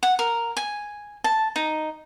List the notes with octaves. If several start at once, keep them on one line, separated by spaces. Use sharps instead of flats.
F#5
A#4
G#5
A5
D#4